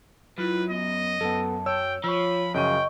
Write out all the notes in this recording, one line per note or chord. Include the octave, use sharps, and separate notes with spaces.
F#2 E4 F4 B4
B3 D#5
F#2 B3 A4 A5
C#5 G5 E6
F3 F4 C#5 B5 C#6 E6
F#2 C#3 D#5 G5 C#6 D#7